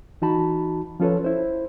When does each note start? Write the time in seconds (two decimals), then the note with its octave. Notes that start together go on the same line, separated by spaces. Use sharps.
0.22 E3 D#4 F#4 A5 B5
1.00 F3 C#4 F4 A4 B4 C#5
1.24 E4 C5